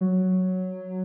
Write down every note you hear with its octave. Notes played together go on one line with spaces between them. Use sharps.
F#3